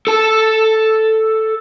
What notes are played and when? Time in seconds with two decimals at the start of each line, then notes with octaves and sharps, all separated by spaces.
0.07 A4 A5